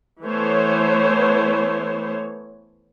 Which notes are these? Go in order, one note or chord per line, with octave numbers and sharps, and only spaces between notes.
E3 A3 B3 C5 C#5